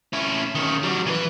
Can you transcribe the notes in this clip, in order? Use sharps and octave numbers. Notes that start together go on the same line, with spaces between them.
C#4 E4
D#3 C#4
F#3 G3
E3 B4